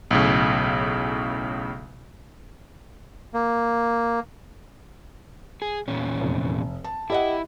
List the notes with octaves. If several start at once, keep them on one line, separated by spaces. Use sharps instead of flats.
B1 A2 C#3
A#3
G#4
E2 A#2 C#4
F1
A5
E4 G4 D#5 F#5